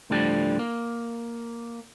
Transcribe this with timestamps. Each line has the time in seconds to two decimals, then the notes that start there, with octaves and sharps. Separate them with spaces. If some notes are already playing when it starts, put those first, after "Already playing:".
0.10 D2 A2 D3 F3 G3 D4
0.59 A#3